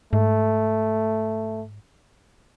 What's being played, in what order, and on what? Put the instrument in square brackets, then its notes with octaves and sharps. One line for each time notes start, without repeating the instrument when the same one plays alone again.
[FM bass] G#2 [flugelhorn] A3